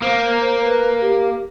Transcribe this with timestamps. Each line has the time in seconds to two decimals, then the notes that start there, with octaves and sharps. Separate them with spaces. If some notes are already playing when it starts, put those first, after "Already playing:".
0.02 A#3 C5
0.64 B4
1.01 G4